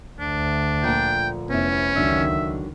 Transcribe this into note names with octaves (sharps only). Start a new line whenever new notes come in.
D2 D4
A#2 D3 F3 G5
F1 B3 C#4 E4
C#2 D3 D#3 F#3 D4 E5